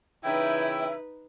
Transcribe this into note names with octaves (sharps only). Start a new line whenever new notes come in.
C#3 E3 D#4 E4 B4 E5 G5